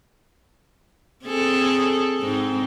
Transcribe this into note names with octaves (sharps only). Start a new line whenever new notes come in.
C4 G#4 A4
G#2 C4 D#4